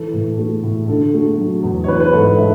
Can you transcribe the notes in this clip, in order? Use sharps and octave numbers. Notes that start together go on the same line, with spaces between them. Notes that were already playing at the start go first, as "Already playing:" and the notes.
Already playing: E3 A4
A2
A3
A2
D3 A4
A3
F#3
E2
C#5
E3 B4
B4
G#2 A4
G#3 E5